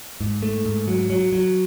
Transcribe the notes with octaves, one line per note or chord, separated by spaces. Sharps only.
G#2
A3
G#2
F#3
F#3
F#3